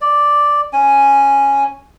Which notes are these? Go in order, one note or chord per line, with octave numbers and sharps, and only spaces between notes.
D5
C#4 G#5